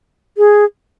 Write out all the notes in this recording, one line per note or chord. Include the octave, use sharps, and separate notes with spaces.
G#4